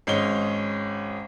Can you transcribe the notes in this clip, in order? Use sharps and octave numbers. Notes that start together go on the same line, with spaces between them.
G#1 G#3 C#4 C#5 G7